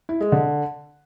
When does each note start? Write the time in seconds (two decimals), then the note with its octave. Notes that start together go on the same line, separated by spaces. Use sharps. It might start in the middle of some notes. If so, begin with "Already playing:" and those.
0.09 E4
0.21 G#3
0.32 D3